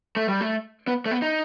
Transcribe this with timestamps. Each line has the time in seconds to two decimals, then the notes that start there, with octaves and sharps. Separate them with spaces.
0.16 A3
0.28 G3
0.41 A3
0.87 B3
1.06 A3
1.11 B3
1.22 D#4